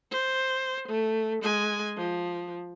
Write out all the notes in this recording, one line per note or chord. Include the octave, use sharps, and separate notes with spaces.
C5
A3
G#3 G#5
F3